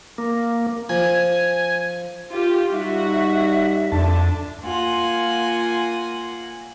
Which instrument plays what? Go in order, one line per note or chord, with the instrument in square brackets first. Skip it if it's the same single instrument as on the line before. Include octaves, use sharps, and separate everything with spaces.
[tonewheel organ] A#3
[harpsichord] F3 [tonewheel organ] G#5
[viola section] F4 G4
[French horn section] G3 D#4 [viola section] F#4 [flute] E5
[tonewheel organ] F2 A5 [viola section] D3 D4
[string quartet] A#3 F4 F#5 G#5